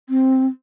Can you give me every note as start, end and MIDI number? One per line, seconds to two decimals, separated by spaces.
0.09 0.47 60